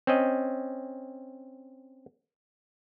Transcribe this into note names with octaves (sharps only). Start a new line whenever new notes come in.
C4 C#4 D#5